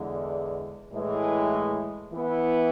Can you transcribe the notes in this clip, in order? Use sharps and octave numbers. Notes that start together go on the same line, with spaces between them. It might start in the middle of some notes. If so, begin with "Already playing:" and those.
Already playing: E2 D3 G#3
A2 E3 G#3
E3 B3 E4